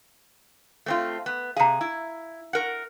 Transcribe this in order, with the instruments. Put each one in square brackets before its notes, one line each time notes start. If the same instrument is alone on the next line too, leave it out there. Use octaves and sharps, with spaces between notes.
[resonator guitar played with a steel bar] A3 C4 F4
B3
[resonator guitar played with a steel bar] C3 G#4 [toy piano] F5 A#5
[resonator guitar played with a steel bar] E4
A#4 F#5